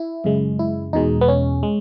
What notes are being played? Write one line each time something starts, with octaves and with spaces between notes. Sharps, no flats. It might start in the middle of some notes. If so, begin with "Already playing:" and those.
Already playing: E4
F#2 C#3 G#3
E4
E2 B2 G#3 D#4
B3
C#4
G#3